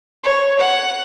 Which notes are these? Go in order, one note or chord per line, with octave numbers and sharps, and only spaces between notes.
C#5
F#5